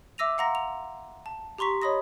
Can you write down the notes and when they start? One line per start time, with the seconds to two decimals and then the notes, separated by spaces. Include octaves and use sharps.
0.18 E5 D6 E6 A#6 D#7 F7
0.38 F5 F#5 A#5 C6 A#6
0.55 F7
1.26 A5
1.58 G4 A#5 C6 C#6 B6
1.82 C#5 D#5 B5 D#6 A#6